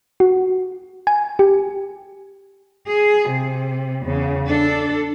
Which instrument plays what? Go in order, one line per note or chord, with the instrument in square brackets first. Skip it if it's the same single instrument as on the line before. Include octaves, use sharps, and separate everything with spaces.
[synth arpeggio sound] F#4
G#5
G4
[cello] G#4
C3
E2 C#3
D4 A4